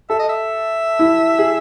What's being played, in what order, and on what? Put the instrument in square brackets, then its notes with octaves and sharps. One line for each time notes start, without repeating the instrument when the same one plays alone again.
[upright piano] A4 [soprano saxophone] E5
[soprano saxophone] D#5
E5
[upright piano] E4
G#4